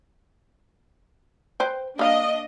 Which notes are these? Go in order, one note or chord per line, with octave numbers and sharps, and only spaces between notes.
B4 C5 G5
A#3 D4 D#5 F5